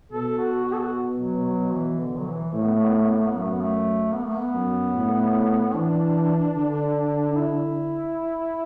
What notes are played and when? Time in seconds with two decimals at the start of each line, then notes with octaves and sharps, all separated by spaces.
0.12 B2 A4
0.39 F#4
0.65 F#4
0.73 A4
0.80 F#4
1.19 F#3
1.46 F#3
1.73 E3
2.00 D3
2.18 F#3
2.26 E3
2.53 A2 A3
2.64 B3
2.74 A3
2.85 B3
2.96 A3
3.06 B3
3.18 A3
3.28 B3
3.34 F#2 A3
3.50 B3
3.61 A3
4.14 B3
4.26 A3
4.37 B3
4.54 F#2
4.95 A2
5.74 E3 D4
6.56 D3
7.31 D4
7.36 E4